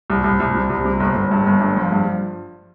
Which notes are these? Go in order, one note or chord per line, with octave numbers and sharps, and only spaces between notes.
C2
C2
C2
C3
C2
C3
G1
G1
G2
G1
G2
F3
G2